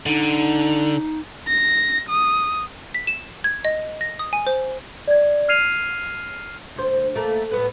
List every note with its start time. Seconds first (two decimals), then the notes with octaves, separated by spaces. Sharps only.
0.06 D3 D#4
1.48 A#6
2.09 D#6
2.94 B6
3.07 E7
3.44 G#6
3.65 D#5
4.01 A#6
4.19 D#6
4.33 G#5
4.47 C5
5.08 D5 G#6
5.49 F6 G#6 C7 D#7 F7
6.76 D2 C5
7.15 A3 A#3
7.51 A2 B3 B4